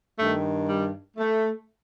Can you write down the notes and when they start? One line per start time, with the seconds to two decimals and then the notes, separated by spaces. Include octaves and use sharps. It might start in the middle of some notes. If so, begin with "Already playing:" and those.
0.17 G2 D#3 A3
0.67 G3
1.17 A3